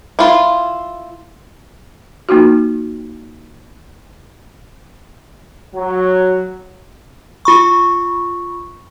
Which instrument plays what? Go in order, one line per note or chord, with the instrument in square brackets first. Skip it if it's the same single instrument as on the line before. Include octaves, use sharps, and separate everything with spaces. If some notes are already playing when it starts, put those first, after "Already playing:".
[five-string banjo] E4 F4
[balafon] A#3 D#4 F4 F#4
[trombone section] F#3
[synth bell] F4 B5 C#6